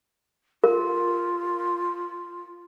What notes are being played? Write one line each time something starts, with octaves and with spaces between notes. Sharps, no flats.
F4 A#4